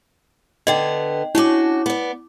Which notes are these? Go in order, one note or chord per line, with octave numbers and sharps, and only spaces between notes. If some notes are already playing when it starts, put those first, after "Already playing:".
D3 B3 D#5 G5
C#4 D4 E4 F#4 D6
B3 D5